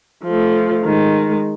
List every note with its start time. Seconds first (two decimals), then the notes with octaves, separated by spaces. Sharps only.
0.24 F3 A3
0.84 D#3 G#3